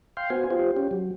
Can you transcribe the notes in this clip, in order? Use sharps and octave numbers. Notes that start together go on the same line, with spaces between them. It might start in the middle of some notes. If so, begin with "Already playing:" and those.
F5 G5 C6
B3 F#4 C5 G#5
F4 G4 C5
C#4 G4
F#3